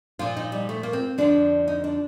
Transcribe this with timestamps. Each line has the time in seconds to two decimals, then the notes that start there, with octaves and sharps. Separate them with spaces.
0.19 A#2 F3 F4
0.37 D#4
0.52 G3
0.69 A3
0.83 A#3
0.93 C4
1.18 F2 D3 F3 D4
1.68 D#4
1.84 D4